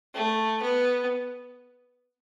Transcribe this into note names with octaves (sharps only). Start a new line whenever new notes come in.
A3
B3